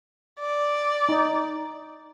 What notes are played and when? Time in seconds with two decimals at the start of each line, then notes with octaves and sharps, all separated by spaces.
0.39 D5
1.09 D#4